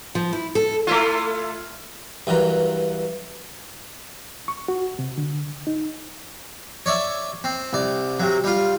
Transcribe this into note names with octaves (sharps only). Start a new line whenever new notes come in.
F3
E4
A4
A3 E4 F4
G2 E3 F#3 A#4
C#6
F#4
C3
D3
D#4
C#5 D5 E5
C4
C2 D5
C3 F#3
G3 F4